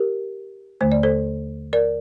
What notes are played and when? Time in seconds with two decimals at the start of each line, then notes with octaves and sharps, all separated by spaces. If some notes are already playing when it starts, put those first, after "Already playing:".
Already playing: G4 A#4
0.81 D#2 D3 A3 C5
0.92 D5
1.03 A4 C5
1.73 A#4 D5